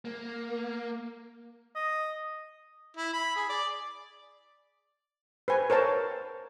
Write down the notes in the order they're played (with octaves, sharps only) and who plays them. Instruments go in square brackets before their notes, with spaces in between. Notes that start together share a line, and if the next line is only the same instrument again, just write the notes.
[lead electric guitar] A#3
[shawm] D#5
[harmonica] E4
B5
G#4
D5
[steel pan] B4 C5 G#5
A#4 C5 C#5 A5